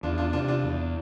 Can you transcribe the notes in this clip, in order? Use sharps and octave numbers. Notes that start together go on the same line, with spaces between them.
E2 D4 F4
D4 F4
C3 D4 F4
D4 F4
E2